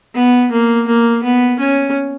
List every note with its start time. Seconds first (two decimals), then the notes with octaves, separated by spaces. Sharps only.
0.15 B3
0.52 A#3
0.87 A#3
1.24 B3
1.59 C#4